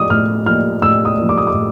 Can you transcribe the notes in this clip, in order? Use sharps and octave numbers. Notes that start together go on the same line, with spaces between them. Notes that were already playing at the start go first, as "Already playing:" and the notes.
Already playing: A2 F3 A#3 D6 D#6
A2 F6
F3 A#3 F6
A2 E6
D#6
F3 A#3
D6
D#6
D6
A2